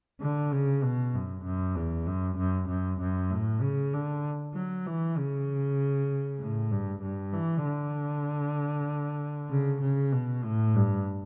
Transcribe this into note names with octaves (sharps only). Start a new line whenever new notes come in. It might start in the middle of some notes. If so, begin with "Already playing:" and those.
D3
C#3
B2
F#2
F#2
E2
F#2
F#2
F#2
F#2
A2
C#3
D3
F#3
E3
C#3
A2
G2
G2
E3
D3
C#3
C#3
B2
A2
G2